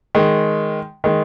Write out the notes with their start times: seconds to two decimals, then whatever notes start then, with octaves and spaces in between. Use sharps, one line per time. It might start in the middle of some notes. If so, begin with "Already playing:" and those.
0.15 D#3 G#3
1.04 D#3 G#3